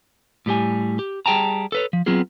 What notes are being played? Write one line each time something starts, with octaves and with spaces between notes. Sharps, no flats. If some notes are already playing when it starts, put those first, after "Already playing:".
A2 G3 G4 G#5
G4
G3 G#4 G5 A5 A#5
A4 B4 C#5
F3
F#3 B3 C4 F4 G#4